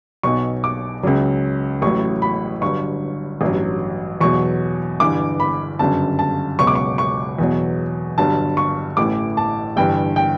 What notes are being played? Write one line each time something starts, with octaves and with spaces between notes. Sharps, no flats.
B1 B2 F#3 C#6
D6
C#2 C#3 F#3
A1 A2 F#3 C#6
B5
G1 G2 F#3 C#6
A1 G2 F#3
E2 B2 F#3 C#6
G1 G2 E3 D6
B5
G1 F#2 C#3 F#3 A5
A5
C#2 B2 F#3 C#6
D6
C#6
C#6
E2 B2 F#3
G1 G2 F#3 A5
C#6
A1 A2 E3 D6
A5
G1 G2 E3 G5
G5